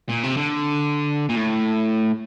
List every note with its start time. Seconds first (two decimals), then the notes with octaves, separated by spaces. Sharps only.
0.09 A#2
0.23 C3
0.37 D3
1.29 A#2
1.35 A2